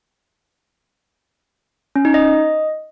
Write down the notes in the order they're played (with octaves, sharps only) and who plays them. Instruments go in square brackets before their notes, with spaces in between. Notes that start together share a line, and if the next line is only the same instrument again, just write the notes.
[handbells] C#4
D#4
D#5